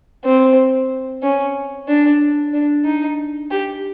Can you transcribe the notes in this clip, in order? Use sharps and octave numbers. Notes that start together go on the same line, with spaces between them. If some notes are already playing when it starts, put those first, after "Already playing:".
C4
C#4
D4
D4
D#4
G4